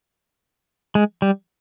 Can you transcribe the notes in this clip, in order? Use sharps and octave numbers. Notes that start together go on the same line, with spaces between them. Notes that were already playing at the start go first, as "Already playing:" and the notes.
G#3
G3